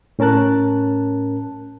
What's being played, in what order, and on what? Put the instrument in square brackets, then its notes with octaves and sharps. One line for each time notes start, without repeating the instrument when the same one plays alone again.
[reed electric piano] A2 C#4 A#4 A5 F#6